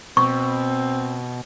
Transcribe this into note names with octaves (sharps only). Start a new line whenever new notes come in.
B2 C4 C#6